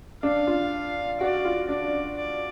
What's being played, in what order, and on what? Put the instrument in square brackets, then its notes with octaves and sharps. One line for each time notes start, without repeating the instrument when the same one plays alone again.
[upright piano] D4 [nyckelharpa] F5
[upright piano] F4
[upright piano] F#4 [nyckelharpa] D5
[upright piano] F4
[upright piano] D4 [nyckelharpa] D5
[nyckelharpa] D5